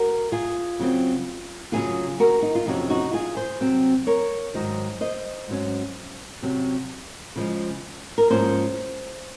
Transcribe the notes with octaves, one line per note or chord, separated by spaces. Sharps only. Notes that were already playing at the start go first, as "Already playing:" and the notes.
Already playing: F#4 A#4
F4 G#4
C#3 F#3 C4
F#2 C#3 F#3 C#4 F4 G#4
F#4 A#4
D#4
F4
F2 C3 F#3 A#3 C#4 D#4 F#4
D#4 F#4
F4 G#4
G#4 C5
C3 F#3 C4
A#4 C#5
G#2 D#3 F#3 C5 D#5
C5 D#5
G#2 F#3 C#4
C3 F#3 C#4
C#3 F3 G#3
A#4
G#2 F3 A#3 C#4 G#4 C5